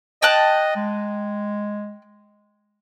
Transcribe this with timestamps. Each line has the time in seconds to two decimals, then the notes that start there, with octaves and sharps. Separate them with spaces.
0.22 D#5 G5 A5 F#6
0.76 G#3